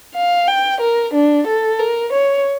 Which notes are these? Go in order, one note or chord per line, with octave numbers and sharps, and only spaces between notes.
F5
G5
A#4
D4
A4
A#4
C#5